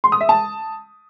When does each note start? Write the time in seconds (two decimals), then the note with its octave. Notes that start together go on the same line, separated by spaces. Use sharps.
0.04 C6
0.12 D#6
0.21 E5
0.29 A5